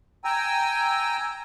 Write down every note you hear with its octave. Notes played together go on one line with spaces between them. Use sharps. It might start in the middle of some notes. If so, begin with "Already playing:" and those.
G5 G#5 A#5 E6